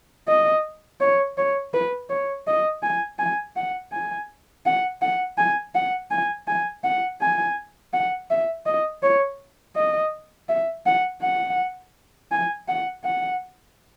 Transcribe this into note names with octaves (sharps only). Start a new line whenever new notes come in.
D#5
C#5
C#5
B4
C#5
D#5
G#5
G#5
F#5
G#5
F#5
F#5
G#5
F#5
G#5
G#5
F#5
G#5
F#5
E5
D#5
C#5
D#5
E5
F#5
F#5
G#5
F#5
F#5